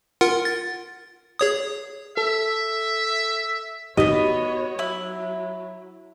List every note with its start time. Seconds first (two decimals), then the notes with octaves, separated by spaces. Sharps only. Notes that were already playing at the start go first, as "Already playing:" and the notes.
0.21 F4 A#4 F#5
0.45 A6
1.39 G#4 C#5 D#6
2.17 A4 E5
3.97 B3 D#4 F#4 G4 C#5 D#5
4.79 F#3 E4